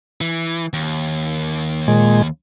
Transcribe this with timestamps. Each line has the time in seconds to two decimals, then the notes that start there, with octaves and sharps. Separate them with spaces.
0.21 E3
0.73 D#2
1.88 A#2 G#3